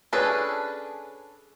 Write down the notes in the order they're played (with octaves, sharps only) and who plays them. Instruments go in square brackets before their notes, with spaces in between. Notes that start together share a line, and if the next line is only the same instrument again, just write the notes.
[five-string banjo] C#4 D4 G#4 A4 B4